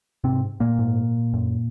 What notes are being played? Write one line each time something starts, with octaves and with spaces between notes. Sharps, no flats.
G#2 C3 C4
A#2 A#3
G#2
F#2